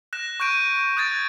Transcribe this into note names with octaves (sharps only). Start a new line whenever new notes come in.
F#6 A#6 E7
C#6 F#6 G6 D7 D#7
D#6 F#6 G#6 A6 D7